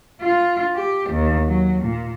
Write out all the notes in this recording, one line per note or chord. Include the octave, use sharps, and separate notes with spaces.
F4
G4
D#2
F#3
A#2